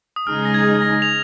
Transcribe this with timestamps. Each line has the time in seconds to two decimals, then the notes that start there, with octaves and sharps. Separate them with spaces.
0.16 D#6
0.27 C#3 G#3 D#4 G#4 F6
0.45 A#6
0.54 G#6
0.82 A#6
1.02 F7